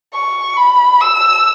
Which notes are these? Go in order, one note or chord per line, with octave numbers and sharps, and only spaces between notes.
C#6
B5
E6